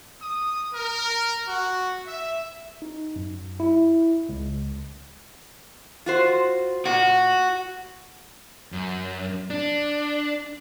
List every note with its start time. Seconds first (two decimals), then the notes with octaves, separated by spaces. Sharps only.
0.20 D#6
0.72 A#4
1.46 F#4
2.06 E5
2.82 D#4
3.16 F#2
3.60 E4
4.29 C#2
6.06 F4 F#4 C5
6.85 A#2 F#4
8.72 F#2
9.50 D4